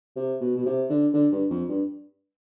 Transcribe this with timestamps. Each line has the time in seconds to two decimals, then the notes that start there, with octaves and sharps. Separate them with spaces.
0.17 C3
0.41 B2
0.57 B2
0.66 C3
0.90 D3
1.14 D3
1.32 G2
1.51 F2
1.69 G2